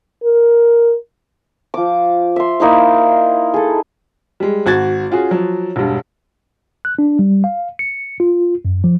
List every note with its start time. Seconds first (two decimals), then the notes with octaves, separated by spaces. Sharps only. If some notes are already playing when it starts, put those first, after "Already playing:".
0.24 A#4
1.74 F3 D6
2.36 E5 C6
2.60 A#3 D#4 E4 F5
3.54 G#4 A4
4.40 G3 G#3
4.66 G#1 F#4 G#6 A6
5.11 C#4 F4 F#4 G#4
5.31 F3 F#3
5.76 E1 G2
6.85 F#6
6.99 D4
7.19 G3
7.44 F5
7.79 C#7
8.20 F4
8.65 F#2
8.84 F3